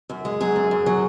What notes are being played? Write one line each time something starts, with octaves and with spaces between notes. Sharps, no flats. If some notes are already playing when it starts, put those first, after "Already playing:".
F#2
G#3
F#3 G#4
F#2
F#2
F#3